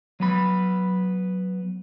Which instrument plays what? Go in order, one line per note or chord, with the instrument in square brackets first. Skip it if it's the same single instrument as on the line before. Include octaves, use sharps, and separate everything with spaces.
[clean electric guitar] F#3 B3 B5